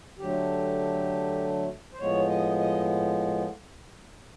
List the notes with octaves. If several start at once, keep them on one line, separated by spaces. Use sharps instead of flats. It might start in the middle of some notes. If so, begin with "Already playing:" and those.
D3 F#3 A3 G4
C5
A2 F3 G#3 B3 C#5
D#5
D#5